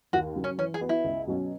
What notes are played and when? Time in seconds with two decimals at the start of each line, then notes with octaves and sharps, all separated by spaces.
0.13 D#2 F#4
0.36 C#3 F#3
0.44 C#4
0.58 E3 C#4
0.74 G#4
0.81 B3 F#4
0.89 E4
1.04 C#2
1.27 B2 F#3 C#4